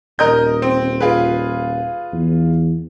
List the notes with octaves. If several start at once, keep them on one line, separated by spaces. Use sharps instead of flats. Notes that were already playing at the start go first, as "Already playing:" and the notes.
D#1 A#4 D#5 G6
C4
F4 G#4 B4
E2